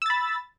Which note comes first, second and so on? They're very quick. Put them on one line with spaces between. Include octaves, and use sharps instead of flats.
E6 A6 B5